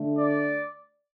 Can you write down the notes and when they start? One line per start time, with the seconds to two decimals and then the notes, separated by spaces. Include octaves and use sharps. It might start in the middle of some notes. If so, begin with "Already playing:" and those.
Already playing: D3 A3
0.19 D5